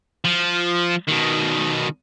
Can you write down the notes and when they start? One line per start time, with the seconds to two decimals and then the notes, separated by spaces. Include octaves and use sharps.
0.25 F3
1.08 B2 D#3